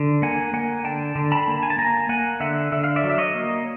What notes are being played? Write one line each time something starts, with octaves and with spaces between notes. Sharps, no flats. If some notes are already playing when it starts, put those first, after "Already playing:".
Already playing: D3
A#3 F#5 G#5
A#3 F#5 G#5
D3 G5 A5
D3
A5 B5
A#3
G#5
A5
A#3 G#5 A#5
A#3 F#5 G#5
D3 E5 F#5
D3 E5
F5
D5 E5
F#3
E5
C#5 D#5
A#3